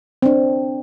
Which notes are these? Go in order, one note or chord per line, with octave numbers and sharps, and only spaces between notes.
C4 D4